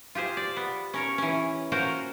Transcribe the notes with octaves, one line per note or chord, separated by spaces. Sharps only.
F4 G4 G#4 C5
D5
B3
C#4 A#4 C#5
E3 C#4
A#3 C#4 F4 F#4 A#4 C5